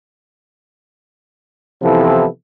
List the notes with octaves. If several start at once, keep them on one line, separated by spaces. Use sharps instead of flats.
C3 E3 F3 B3 E4 A4